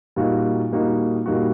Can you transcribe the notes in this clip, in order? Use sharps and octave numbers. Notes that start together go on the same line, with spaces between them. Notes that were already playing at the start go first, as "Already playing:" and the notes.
A#2 G3 A#3 D#4 F#4
A#2 G3 A#3 D#4 F#4
A#2 G3 A#3 D#4 F#4